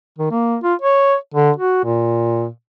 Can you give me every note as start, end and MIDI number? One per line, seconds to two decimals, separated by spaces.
0.18 0.31 51
0.31 0.57 58
0.64 0.74 65
0.82 1.15 73
1.34 1.51 50
1.56 1.84 66
1.84 2.47 46